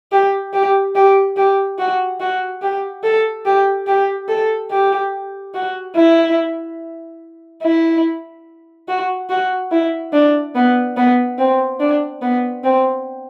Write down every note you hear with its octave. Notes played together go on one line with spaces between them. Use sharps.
G4
G4
G4
G4
F#4
F#4
G4
A4
G4
G4
A4
G4
F#4
E4
E4
F#4
F#4
E4
D4
B3
B3
C4
D4
B3
C4